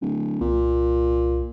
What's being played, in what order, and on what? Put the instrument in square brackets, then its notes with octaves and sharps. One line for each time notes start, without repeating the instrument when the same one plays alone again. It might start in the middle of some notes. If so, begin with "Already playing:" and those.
[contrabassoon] D1
[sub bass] C2 [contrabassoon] A#2